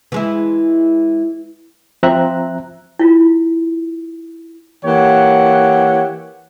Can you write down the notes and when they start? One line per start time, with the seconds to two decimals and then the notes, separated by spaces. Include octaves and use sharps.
0.12 E3 G#3 E4
2.03 F3 C4 E5 A#5 F#6
2.99 E4 F4
4.85 E3 A#3 G4 C#5 F#5